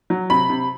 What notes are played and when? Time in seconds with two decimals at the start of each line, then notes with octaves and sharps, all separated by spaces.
0.10 F#3
0.30 C3 B5
0.50 C3